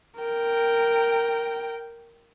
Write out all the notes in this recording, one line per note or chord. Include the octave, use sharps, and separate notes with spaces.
A#4 G5